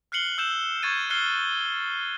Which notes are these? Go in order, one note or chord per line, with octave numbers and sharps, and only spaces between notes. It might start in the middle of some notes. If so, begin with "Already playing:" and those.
F6 F#6 C7 C#7 F#7 G7
E6 G6 E7
C#6 G#6 A6 D#7
F6 F#6 G#6 C7 C#7 G7